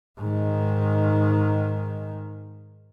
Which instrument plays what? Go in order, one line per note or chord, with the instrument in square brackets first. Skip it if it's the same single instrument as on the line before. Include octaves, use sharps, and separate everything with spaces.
[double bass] G#2 D#3